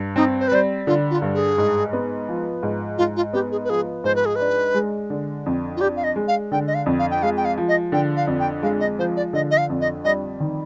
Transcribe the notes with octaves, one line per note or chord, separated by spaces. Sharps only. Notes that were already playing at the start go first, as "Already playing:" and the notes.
Already playing: G2
C4 D#4
C5
B4
G3 C5
D3 F4
F4
G2
G#4
G#2
B3
F3
G#2
G#2 F4
F4
B3 G4
G#4
B4
F3 G#4
G#2 C5
B4
G#4
D4 B4
G#3
D3
F2
F4
D4 G4
F5
D#5
G#3
F5
D3 G5
D#5
F5
F2
F5
G5
G#3 F5
G5
F5
F3
D#5
D3 G5
F5
F2
G5
G#3 F5
D#5
F3 C5
D5
D3 D#5
D#5
F5
F2
D#5
G3 D#5
D#3